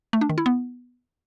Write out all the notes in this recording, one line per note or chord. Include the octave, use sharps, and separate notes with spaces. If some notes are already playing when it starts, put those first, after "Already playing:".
A3
D4
D#3
E4
B3